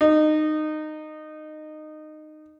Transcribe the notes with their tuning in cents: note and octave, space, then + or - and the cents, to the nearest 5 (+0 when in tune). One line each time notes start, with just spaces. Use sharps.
D#4 -20